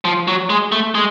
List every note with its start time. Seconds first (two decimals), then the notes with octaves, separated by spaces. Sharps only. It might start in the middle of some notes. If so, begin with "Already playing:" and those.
0.05 F3
0.28 F#3
0.50 G#3
0.72 A3
0.95 G#3